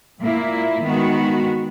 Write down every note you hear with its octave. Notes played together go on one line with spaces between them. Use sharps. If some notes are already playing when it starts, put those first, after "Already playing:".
A#2 A#3 E4
D#3 G#3 B3 F#4